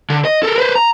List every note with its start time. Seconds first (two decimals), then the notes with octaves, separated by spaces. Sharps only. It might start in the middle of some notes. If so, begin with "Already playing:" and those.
0.10 D3
0.25 D#5
0.43 A4 A#4
0.58 B4 C5
0.75 A#5